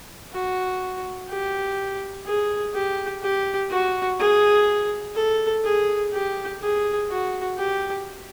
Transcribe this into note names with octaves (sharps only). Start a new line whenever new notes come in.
F#4
G4
G#4
G4
G4
F#4
G#4
A4
G#4
G4
G#4
F#4
G4